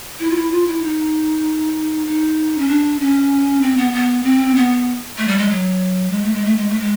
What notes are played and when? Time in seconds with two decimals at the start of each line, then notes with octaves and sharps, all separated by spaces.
0.20 E4
0.30 F4
0.36 E4
0.51 F4
0.67 E4
0.83 D#4
2.07 D#4
2.58 C#4
2.68 D4
3.00 C#4
3.62 C4
3.77 B3
3.93 B3
4.24 C4
4.55 B3
5.18 A3
5.28 G3
5.38 G#3
5.49 F#3
6.11 G#3
6.23 A3
6.34 G#3
6.45 A3
6.56 G#3
6.68 A3
6.80 G#3